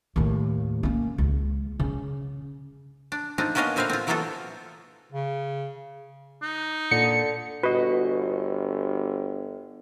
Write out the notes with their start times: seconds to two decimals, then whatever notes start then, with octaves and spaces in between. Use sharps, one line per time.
0.16 D#2 A2
0.83 A#3 C#4
1.18 C#2
1.80 C#3
3.12 D4
3.38 C4 D4 D#4 F4
3.55 A#3 B3 C#4 D4 D#5 F5
3.76 A#2 D3 C4 B4 E5 F5
3.90 C4 F4
4.07 E3 F#3 A#3 B3 F4 A4
5.12 C#3
6.43 D#4
6.91 A#2 D3 C#7
7.63 G1 F#4 B4 D#5